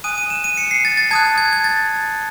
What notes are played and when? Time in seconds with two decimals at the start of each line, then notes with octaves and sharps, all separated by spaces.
0.04 G#5 D#6 F#6 D#7
0.18 D#7
0.30 E7
0.44 D#7
0.57 C#7
0.71 C7
0.85 A6
0.97 A6
1.11 A5 D#6 F#6 G#6
1.38 G#6
1.53 G#6
1.64 A6